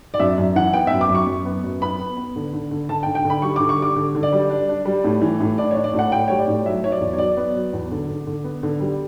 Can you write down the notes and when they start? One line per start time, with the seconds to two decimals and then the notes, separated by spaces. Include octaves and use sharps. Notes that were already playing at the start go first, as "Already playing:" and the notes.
0.14 D5
0.20 F#2 E5
0.38 F#2
0.56 E3 F#5
0.73 B3 G5
0.87 F#2 E5
1.01 D6
1.09 F#2
1.15 C#6
1.27 F#2
1.45 B3
1.64 F#2
1.82 B3 B5
1.99 B3
2.17 B3
2.36 D3
2.53 D3
2.71 D3
2.89 D3 A5
3.03 G5
3.06 D3
3.15 G5
3.25 D3
3.30 B5
3.42 G3 C#6
3.56 D3 D6
3.69 C#6
3.79 G3 D6
3.96 D3
4.15 D3
4.23 D5
4.32 G3
4.50 D4
4.68 D4
4.85 G3
5.04 A2
5.22 E3
5.40 A2
5.58 D4 D5
5.71 D4 C#5
5.84 D5
5.94 A2
5.99 F#5
6.12 A2 G5
6.28 G3 C#5
6.39 D5
6.48 A2
6.66 F#3 E5
6.83 F#3 C#5
6.92 D5
7.01 E2
7.13 C#5
7.18 F#3 D5
7.37 B3
7.55 F#3
7.73 E2
7.91 D3
8.08 D3
8.27 D3
8.44 B3
8.63 D3
8.80 G3